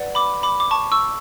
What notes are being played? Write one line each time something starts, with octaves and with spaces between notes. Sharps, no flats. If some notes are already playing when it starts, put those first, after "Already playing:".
Already playing: B4 D5 F#5
B5 D6
B5 D6
D6
A5 C#6
C#6 E6